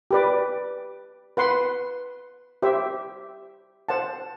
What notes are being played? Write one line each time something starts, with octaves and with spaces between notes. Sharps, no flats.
G4 B4 D5
B4 F#5 C6
G4 C5 E5
C5 F#5 A5